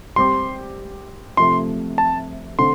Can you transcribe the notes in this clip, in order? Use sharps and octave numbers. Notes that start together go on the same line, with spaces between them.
G3 C4 G4 C6
C3 F3 A3 C6
A5
D3 A3 C4 C6